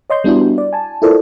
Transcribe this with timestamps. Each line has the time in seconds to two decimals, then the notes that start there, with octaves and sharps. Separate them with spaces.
0.10 C#5 D#5 C6 G6
0.24 G3 B3 D4 E4 F#4
0.58 D5
0.73 G#5 A5
1.02 E4 F4 A4 A#4 C5 D5